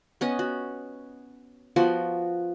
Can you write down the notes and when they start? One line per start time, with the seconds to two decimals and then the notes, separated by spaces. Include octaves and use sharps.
0.21 B3 C#4 D#5
0.39 F#4
1.76 F3 B3 F#4 C6